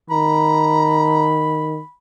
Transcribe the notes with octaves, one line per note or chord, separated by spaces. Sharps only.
D#3 A#5 B5